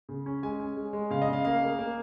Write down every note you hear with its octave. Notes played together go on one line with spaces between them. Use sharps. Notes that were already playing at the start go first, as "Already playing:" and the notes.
C#3
C#4
G#3 G#5
C#4
G#3
G#3
C#3 F5
D#5
C#3 F5
A#3 F5
A#3
A#3